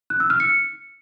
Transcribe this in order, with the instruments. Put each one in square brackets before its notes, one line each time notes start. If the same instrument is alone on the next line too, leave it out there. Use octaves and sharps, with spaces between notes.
[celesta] F#6
E6
F6
C#7